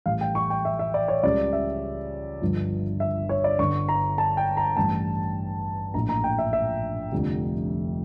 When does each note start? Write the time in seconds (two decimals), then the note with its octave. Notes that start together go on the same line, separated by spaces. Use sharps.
0.06 A1 A2 E3 G3 F5
0.21 G5
0.35 C#6
0.50 G5
0.65 E5
0.79 E5
0.94 D5
1.08 C#5
1.23 C#2 C#3 G3 D5
1.53 E5
2.42 G1 G2 D3 F3
3.00 E5
3.29 C#5
3.44 D5
3.59 G1 G2 D3 C#6
3.89 A#5
4.18 A5
4.37 G5
4.57 A#5
4.77 A1 G2 E3 G3 A5
5.94 A#1 A2 F3 A#5
6.09 A#5
6.24 G5
6.38 E5
6.53 E5
7.12 F1 F2 D3 G3